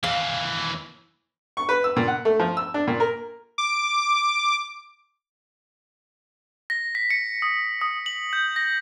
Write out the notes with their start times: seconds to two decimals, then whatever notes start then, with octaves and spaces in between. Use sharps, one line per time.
0.04 D#2 E3 F5
1.57 C#6
1.69 B4
1.84 E6
1.96 A#2
2.08 F#5
2.25 A3
2.39 F3
2.57 E6
2.74 D4
2.87 A#2
3.00 A#4
3.58 D6
6.70 A#6
6.95 B6
7.10 C#7
7.42 D#6
7.81 D#6
8.06 F#7
8.33 G6
8.56 A#6